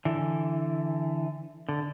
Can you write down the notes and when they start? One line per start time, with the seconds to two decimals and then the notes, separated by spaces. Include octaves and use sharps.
0.05 D3 E3
1.69 D3